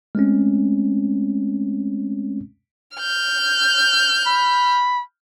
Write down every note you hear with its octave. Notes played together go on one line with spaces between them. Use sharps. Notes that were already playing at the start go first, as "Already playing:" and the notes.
G#3 A3 C4 C#4
F6 G6
B5